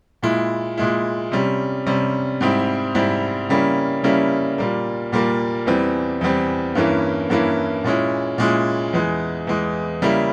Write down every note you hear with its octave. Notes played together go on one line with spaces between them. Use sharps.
A#2 G#3 E4
A#2 G#3 E4
C3 G3 C#4
C3 G3 C#4
G#2 G3 C4 E4
G#2 G3 C4 E4
C#3 G3 A#3 C#4 E4
C#3 G3 A#3 C#4 E4
A#2 G3 A#3
A#2 G3 A#3
E2 E3 G3 C4
E2 E3 G3 C4
G2 E3 A#3 C#4 E4
G2 E3 A#3 C#4 E4
A#2 G#3 C#4 E4
A#2 G#3 C#4 E4
E2 E3 G#3
E2 E3 G#3
C#3 G3 A#3 C#4 E4